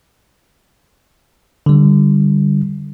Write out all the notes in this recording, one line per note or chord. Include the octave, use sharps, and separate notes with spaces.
D3 G3